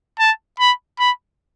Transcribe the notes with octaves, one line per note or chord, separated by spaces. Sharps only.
A5
B5
B5